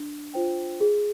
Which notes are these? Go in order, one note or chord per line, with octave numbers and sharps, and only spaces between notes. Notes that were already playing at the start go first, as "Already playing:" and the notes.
Already playing: D4
F4 C5 G5
G#4